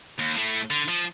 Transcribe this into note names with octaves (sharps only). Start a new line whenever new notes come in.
D#2
A2 A3
D3
F3